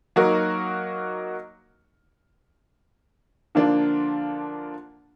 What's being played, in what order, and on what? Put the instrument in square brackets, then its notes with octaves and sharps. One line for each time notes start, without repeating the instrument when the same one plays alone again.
[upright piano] F#3 A#3 D#4 F#4 A#4
D3 F3 A#3 D4 F4